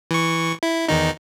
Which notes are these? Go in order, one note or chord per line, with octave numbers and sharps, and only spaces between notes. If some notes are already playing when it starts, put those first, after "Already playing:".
E3 C#6
E4
E2 D#3 D#4